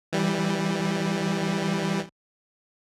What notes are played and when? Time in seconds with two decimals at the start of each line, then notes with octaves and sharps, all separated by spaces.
0.13 E3 G3